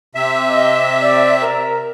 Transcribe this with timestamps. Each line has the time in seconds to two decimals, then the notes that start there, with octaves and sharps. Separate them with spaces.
0.15 C3 E5
0.49 D#5
1.01 D5
1.42 A#4